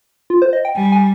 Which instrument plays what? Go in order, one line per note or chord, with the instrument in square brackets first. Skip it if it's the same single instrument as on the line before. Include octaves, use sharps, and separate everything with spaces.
[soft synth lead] F4
C5
D#5
G5
[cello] G3 [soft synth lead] G#5
[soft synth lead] G#5